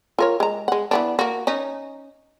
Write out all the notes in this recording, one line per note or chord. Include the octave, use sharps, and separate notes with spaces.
F4 A#4 C#5
G#3 A#5
G#3 F#5
E3 B3 D4
A#3 F#4
C#4 D#4